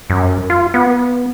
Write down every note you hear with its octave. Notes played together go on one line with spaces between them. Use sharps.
F#2
F4
B3